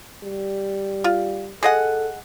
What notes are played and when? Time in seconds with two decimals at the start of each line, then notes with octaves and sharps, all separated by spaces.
0.24 G3
1.04 F4
1.63 G#4 A4 D#5 F#5